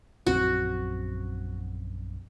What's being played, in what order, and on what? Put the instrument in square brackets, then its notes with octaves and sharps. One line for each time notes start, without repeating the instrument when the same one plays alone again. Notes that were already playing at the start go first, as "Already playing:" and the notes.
[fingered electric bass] A#1 F#2 C4 [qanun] F#4